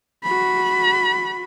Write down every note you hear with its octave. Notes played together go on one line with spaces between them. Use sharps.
F#4 B5